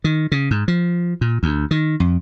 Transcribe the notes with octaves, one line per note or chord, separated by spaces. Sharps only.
D#3
C#3
G#2
F3
A#2
D2
D#3
F2